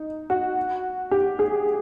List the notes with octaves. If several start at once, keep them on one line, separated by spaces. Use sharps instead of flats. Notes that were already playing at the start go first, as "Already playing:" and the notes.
Already playing: D#4
F#4
G4
G#4